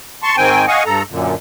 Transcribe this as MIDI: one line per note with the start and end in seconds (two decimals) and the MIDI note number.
0.23 0.36 81
0.23 0.36 84
0.23 0.36 85
0.37 0.66 44
0.37 0.66 51
0.37 0.66 60
0.37 0.66 79
0.37 0.66 80
0.68 0.83 75
0.68 0.83 77
0.68 0.83 78
0.68 0.83 80
0.68 0.83 85
0.68 0.83 87
0.86 1.03 43
0.86 1.03 69
0.86 1.03 82
1.10 1.35 42
1.10 1.35 46
1.10 1.35 50